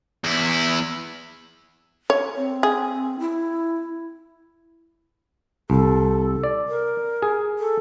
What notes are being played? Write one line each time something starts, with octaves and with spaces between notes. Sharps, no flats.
E2 E4
C#5
C4
G#4
E4
C2 A4
D5
A#4
G#4
A4